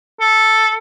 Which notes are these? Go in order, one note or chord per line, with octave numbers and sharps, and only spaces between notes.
A4